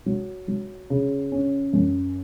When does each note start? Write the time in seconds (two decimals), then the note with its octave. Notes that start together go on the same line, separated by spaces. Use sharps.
0.06 F#3
0.48 F#3
0.90 C#3
1.32 C#4
1.73 F#2